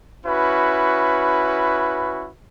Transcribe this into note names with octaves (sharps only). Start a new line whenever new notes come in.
C#4 E4 F#4 B4